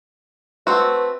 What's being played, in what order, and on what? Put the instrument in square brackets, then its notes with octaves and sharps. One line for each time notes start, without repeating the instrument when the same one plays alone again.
[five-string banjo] A3 C4 F#4 [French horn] B4